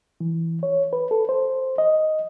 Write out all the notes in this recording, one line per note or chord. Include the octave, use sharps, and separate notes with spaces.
E3
C#5
B4
A4
C5
D#5